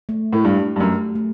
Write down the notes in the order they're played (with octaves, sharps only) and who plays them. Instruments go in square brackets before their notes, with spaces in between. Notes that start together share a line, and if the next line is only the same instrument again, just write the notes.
[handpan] A3
[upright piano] A2
[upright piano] G2 [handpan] G4
[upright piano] G2
[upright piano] F#2 [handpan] A3
[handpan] A3